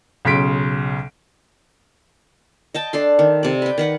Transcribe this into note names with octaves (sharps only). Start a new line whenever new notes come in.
B1 C#3 C6 B6 D7
D#5 G5 A5
D4 A4 C6
D#3
C3 D5
B4 G5
D#3 B4 F#5